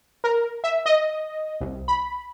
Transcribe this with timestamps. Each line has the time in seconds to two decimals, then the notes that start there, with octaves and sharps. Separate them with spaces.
0.24 A#4
0.64 E5
0.86 D#5
1.61 C2
1.88 B5